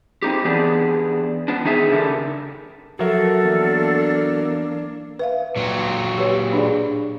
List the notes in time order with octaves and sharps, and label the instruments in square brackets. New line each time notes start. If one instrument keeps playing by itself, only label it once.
[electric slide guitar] C4 D#4 G4
E3 B3 D4 G4 G#4
B3 D4
D#3 D#4 G#4 E5
C#3 D4 G4 A4 A#4
[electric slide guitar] F3 E5 [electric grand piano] F#3 A#4 [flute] A4
[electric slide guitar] E2 [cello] A#3 D4
[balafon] B4 E5 F5
[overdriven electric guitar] A#2 F#3
[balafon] G4 B4 C#5
D4 G#4 D5